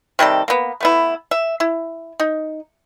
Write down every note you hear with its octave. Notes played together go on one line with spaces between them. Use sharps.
C3 D#3 G3 A4
A#3 B3
A3 B3 E4
E5
E4
D#4